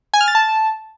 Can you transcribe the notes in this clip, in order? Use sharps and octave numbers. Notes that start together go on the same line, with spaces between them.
G#5
F6
A6
A5